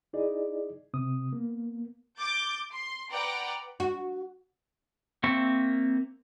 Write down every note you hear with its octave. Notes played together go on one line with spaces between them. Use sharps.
D#4 E4 G#4 D5 D#5
C3 C4 D#6
A#3 B3
D6 G6 A6
C6
B4 D5 F#5 G5 A#5
F#4
A#3 C4 C5 E5 C#6